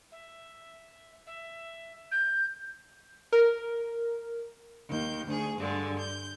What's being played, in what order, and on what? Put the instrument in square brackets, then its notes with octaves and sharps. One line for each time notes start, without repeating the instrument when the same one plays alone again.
[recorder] E5
E5
G6
[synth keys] A#4
[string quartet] D#2 G6
D2 G#4
G2 D3 G#3
G6